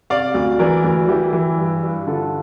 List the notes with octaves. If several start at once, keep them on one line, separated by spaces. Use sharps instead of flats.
C3 D5 F5
D2
E3 A#4 D5
D2
E3 E4 G4
E3
G2
G2
D3 F4 A4